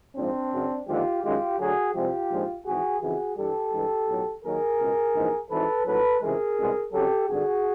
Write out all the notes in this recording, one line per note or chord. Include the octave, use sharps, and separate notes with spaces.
A#1 G#2 F3 G#3 C4 D4
F#2 C#3 F#3
D#2 D3 F3 G#3 F4 G4
F#2 D#3 G#3 F4 G4
D2 D3 F#3 F#4 G#4
C2 C3 F3 G#3 F4 G4
A#1 G#2 F3 G#3
G#1 G#2 E3 F#4 G#4
F2 C#3 E3 F#4 G#4
G2 E3 G3 G4 A4
G2 E3 G#3
B1 A2 F#3
D#2 D#3 F#3 G#4 A#4
C#2 B2 G#3
A#1 G#2 E3 G#3
G#1 G#2 E3 A4 B4
A#1 A2 F#3 A4 B4
C#2 C3 E3 G#3 G#4 A#4
C2 B2 G#3
F2 C#3 F#3 G4 A4
G#1 G2 D3 F#4 G#4